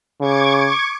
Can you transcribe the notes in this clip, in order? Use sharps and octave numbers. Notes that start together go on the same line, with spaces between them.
C#3 C#6 D6 G#6